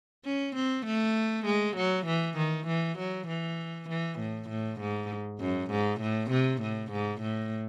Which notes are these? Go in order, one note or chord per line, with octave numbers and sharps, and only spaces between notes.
C#4
C4
A3
G#3
F#3
E3
D#3
E3
F#3
E3
E3
A2
A2
G#2
F#2
G#2
A2
C3
A2
G#2
A2